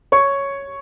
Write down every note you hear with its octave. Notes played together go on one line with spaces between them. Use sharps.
C#5 C#6